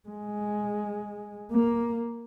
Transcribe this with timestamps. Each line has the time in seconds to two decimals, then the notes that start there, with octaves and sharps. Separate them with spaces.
0.08 G#3
1.52 A#3